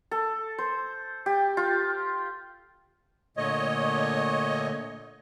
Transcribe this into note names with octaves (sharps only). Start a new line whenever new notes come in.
A4
C5
G4
F4
A#2 D3 A3 C#5 D#5